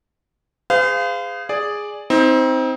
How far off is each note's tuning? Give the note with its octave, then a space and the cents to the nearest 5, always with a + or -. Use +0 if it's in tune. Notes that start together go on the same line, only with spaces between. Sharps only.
G#4 -15 C5 -45 F5 -10
G#4 +0 D5 +0
C4 +0 D#4 +35